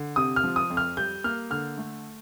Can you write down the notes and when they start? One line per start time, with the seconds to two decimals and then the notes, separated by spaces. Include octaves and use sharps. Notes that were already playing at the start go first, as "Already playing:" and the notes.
Already playing: D3
0.16 C3 D#6
0.36 F6
0.44 F3
0.56 D#6
0.70 F2
0.77 F6
0.97 G3 G6
1.24 A#3 F6
1.50 D3 F6
1.78 A3